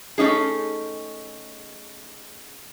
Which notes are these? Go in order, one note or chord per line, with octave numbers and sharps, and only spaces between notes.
A3 C#4 D#4 G#4